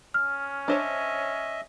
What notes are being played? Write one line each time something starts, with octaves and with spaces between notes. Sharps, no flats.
C#4 F6
D4 C5 C#5 D#5 E5